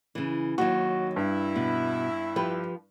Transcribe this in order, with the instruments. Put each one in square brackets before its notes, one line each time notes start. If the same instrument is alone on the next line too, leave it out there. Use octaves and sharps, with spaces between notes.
[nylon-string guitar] C#3 E3
[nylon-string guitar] D#2 D#3 F#3 [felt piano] F#4
[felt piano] G2 [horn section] E4
[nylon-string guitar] B2
F3 G4 B4